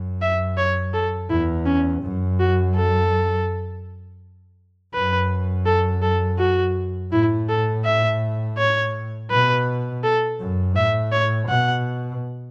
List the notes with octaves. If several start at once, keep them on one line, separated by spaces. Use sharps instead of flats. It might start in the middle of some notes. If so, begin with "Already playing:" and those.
Already playing: F#2
E5
C#5
A4
E2 E4
C#4
F#2
F#4
A4
F#2 B4
A4
A4
F#4
A2 E4
A4
E5
C#5
B2 B4
A4
F#2
A2 E5
C#5
B2 F#5